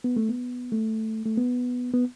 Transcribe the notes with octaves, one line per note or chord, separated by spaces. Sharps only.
B3
A3
B3
A3
A3
B3
B3